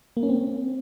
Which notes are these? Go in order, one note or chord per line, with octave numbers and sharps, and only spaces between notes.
A#3
C#4
C4